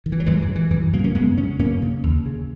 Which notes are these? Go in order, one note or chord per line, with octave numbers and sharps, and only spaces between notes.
D#3
E3
F#3
F#2 E3 G#3
E3
C#3
E3
F#2 E3
E3
C#3 F#3 A#3
A#3 C#4
F#2 G#3 B3
C#3 C#4
F#2 A#3 C#4
C#3
D#2
C#3